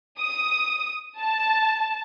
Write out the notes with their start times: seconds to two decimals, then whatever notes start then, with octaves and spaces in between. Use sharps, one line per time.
0.19 D#6
1.21 A5